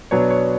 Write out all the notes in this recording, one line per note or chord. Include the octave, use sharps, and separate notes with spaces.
B2 F#3 B3 D4 C#5
C#5